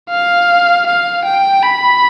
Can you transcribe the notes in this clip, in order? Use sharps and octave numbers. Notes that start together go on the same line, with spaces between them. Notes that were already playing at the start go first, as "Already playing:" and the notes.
F5
F5
G5
B5